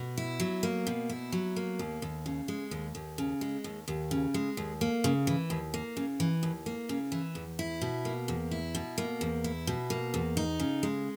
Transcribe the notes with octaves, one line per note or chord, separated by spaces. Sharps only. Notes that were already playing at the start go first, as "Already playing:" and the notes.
Already playing: B2
E4
F#3
A#3
B2
E4
F#3
A#3
D#2
D#2
C#3
G#3
D#2
D#2
C#3
G#3
D#2
D#2
C#3
G#3
D#2
A#3
C#3
E3
D#2
A#3
C#3
E3
D#2
A#3
C#3
E3
E2
E4
B2
A#3
E2
E4
B2
A#3
E2
E4
B2
A#3
E2
D#4
C#3
G#3